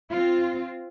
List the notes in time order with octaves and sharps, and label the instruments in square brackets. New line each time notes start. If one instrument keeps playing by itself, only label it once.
[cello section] C4 F4